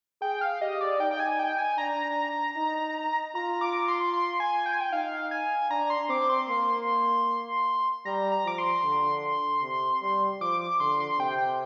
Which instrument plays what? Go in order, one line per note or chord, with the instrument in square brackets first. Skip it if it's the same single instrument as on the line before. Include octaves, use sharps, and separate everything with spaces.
[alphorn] G#4 [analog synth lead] G5
[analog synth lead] F5
[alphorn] G4 [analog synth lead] D#5
[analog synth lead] D5
[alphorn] D#4 [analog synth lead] G5
[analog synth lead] G5
G#5
G5
G#5
[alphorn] D4 [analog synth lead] A#5
[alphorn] D#4
[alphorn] F4 [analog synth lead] A#5
[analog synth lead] D6
C6
C6
G#5
G5
G#5
G5
[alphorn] D#4 [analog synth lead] F5
[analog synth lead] G#5
[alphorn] D4 [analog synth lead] A#5
[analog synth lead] C6
[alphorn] C4 [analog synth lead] D6
[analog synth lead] C6
[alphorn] A#3
[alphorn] G3 [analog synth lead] A#5
[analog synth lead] A#5
[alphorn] F3 [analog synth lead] D6
[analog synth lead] C6
[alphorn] D3
C3
G3
[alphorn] F3 [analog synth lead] D6
[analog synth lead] D6
[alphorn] D3 [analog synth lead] C6
[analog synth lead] C6
[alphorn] C3 [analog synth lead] G5
[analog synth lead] G5